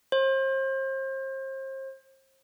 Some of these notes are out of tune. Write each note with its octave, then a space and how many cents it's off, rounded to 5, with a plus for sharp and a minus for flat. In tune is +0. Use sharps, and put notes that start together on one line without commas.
C5 +35